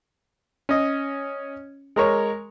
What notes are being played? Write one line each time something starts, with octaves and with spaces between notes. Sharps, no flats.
C#4 D#5
G#3 A#4 C#5